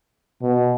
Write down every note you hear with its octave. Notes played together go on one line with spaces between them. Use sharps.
B2